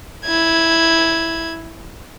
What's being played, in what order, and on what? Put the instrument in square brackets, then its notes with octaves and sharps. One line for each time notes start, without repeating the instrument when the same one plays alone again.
[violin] E4 G#6